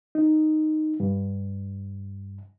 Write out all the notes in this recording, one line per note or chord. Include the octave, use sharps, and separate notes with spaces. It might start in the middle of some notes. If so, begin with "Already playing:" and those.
D#4
G2